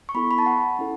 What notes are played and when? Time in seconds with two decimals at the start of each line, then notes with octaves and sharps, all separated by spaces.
0.09 C#6
0.15 B3 E4 A4 B5
0.31 B5
0.38 A5
0.46 F#5
0.79 C#4 E4 A4